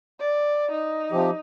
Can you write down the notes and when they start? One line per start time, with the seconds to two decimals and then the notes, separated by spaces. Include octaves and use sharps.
0.20 D5
0.71 D#4
1.12 C3 F3 G4